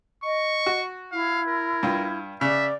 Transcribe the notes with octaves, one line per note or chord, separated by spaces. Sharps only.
D#5 C#6
F#4
E4 F5
A#4
G2 F4
C#3 D5 E5